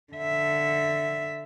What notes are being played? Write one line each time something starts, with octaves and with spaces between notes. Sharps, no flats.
D3 E5